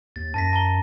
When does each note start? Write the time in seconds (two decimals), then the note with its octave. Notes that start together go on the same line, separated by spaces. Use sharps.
0.16 D#2 A6
0.34 F#2 A5 A#6 B6
0.53 A5 A#5 G7